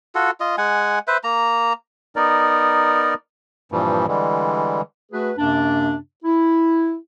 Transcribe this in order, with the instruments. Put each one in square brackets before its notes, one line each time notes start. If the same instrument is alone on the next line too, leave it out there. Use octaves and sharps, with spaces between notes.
[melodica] F4 F#4 A4
F4 D#5
G#3 F#5 G#5
B4 C5 E5
A#3 A#5
[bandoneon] B3 D#4 A#4 D5
G2 A#2 E3 F3 G3
D3 E3 G3 G#3
[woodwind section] A3 F#4 G#4 B4
F#2 C3 A#3 D4
E4